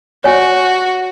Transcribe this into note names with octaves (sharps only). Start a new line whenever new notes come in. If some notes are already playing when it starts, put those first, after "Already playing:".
F#4 C#5 G#5